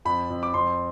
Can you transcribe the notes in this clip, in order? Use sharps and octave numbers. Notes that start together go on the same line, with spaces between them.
F2 B5
F2
D6
F2 C6